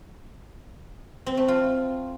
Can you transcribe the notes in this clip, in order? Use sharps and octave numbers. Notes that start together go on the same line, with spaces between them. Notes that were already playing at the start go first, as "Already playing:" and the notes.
C4
A3
F4